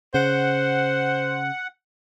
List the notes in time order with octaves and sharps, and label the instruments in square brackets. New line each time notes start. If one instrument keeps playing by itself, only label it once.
[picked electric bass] C#3 [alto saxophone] C5 [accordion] F#5